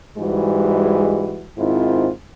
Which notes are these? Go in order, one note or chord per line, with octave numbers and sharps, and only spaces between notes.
G#2 E3 G3 G#3 F#4
G#2 D#3 C4 E4 F4